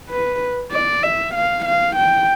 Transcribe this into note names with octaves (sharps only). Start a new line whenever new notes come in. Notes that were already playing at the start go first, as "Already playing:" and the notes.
B4
D5
E5
F5
F5
G5